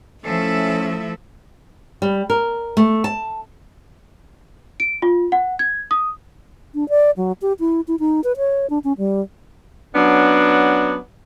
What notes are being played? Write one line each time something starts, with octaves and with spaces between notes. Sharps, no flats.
F3 A3 C#4 E4 A4 E5
G3
A#4
A3
A5
D7
F4
F#5
G#6
D#6
D4
D5
F#3
G4
E4
E4
D#4
B4
C#5
D4
C#4
G3
F#3 B3 C#4 D4